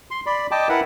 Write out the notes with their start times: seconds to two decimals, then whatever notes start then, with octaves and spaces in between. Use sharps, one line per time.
0.11 C6
0.26 D5 B5
0.51 D#5 G5 A5 D6
0.69 E4 A#4 B4 F#5 B5